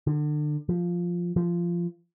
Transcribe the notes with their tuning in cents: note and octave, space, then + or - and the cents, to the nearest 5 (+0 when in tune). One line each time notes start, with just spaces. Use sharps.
D3 +30
F3 +0
F3 -15